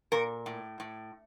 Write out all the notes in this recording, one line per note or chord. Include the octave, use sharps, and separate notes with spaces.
A#2 A#4
A2
A2